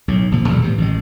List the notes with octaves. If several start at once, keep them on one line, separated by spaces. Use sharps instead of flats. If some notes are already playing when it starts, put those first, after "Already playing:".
B1 A2
F1 A#2 D3 F3
E2 B2 D3 G3
A2 C3 E3
A1 D#3 G#3